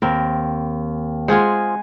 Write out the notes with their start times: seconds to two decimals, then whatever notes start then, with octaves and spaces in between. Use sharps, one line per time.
0.02 D#2 C4 A#4
1.28 G#3 F4 G#4 C5 F#5 G#5